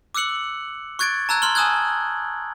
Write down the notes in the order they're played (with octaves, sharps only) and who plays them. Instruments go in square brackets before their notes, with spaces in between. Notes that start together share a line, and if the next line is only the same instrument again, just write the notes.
[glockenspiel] D6 E6 F#6 C#7 F#7
C#6 F#6 G#6 A6 D7
A5 A#5 E6 F#6 G#6
C6 F6 F#7 G7
G#5 A5 D#6 E6 F#6 G#6